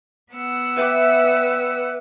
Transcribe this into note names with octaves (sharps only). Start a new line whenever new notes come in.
B3 F#5 E6
B4 E5 G5 D6
D5